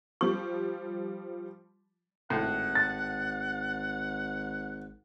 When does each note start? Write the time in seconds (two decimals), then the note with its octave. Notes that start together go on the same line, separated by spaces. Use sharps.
0.21 F3 G3 C#6
2.30 G#1 A2 F#5
2.75 A6